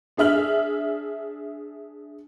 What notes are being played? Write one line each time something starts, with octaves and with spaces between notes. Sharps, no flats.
D4 G#4 E5 F6 F#7